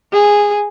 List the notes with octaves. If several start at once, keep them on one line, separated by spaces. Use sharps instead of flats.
G#4